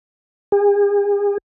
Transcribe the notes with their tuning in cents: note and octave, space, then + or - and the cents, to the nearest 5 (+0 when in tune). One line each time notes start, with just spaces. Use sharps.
G#4 -40